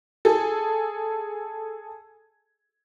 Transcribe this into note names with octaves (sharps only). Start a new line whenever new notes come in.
G#4 A4